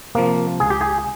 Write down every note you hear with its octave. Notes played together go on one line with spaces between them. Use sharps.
C3 F3 A#3
C#2 G#4
G4
G#4